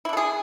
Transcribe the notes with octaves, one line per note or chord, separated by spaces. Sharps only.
D4 E4 G#4 A4